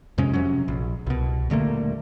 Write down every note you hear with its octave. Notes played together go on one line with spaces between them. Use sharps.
F2 C3 G#3 C#4
F2 C3 F#3 C#4
A#1
C2 B2
D#1 D3 A3 A#3